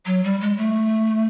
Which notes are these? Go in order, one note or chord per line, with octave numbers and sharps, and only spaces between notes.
F#3
G3
G#3
A3